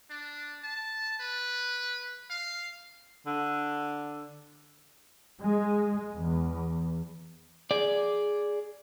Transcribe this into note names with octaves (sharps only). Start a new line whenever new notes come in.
D4
A5
B4
F5
D3
G#3
E2
G#4 D5